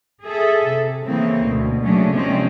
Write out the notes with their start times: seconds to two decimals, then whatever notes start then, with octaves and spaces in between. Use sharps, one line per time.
0.23 G#4 A4 E5
0.67 C3
1.06 C#3 E3 A#3 C4
1.42 D2 B2
1.81 C#3 F#3 A3 A#3 C#4 D4
2.12 C3 F3 G#3 A#3 C4 C#4